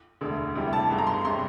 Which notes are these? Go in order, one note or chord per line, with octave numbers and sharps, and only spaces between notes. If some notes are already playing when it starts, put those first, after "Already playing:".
E1 D2 D3
D2 C3 E3 G3
A5
G1 G2 D3
A#5
C6
C3 G3 C6